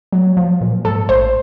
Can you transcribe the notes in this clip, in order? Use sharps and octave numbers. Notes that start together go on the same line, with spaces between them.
F#3
F3
A#2
G#2 A4
A1 C5